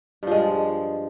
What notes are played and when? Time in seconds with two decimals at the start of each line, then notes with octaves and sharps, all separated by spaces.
0.23 G2
0.27 F3
0.31 G#3